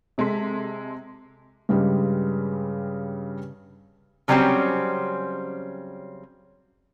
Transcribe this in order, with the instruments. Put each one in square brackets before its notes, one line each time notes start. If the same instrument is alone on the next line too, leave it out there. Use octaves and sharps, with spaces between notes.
[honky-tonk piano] C3 G#3 A4 C6 B6
[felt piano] G2 C#3 G3 G#3
[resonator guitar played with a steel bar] C#3 F#3 G3 C4 C#4 C5